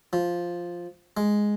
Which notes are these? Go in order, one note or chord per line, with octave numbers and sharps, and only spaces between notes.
F3
G#3